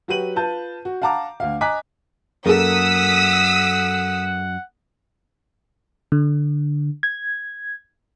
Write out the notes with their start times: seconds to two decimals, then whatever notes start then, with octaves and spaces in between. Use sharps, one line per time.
0.08 F#3 F#4 G4 B4 D#7 F#7
0.36 F4 B4 A5 G6
0.85 F#4
1.02 F5 F#5 A5 A#5 D6
1.40 D2 F5
1.61 D#5 G#5 A#5 D6 F#6 B6
2.46 F#2 A#3 A4 F#5 D#6 E6 B6
6.12 D3
7.03 G#6